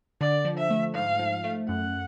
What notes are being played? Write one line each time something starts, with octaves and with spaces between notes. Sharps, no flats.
D3 D5
F3
E5
A3
G#2 F5
F3
A3
F#2 F#5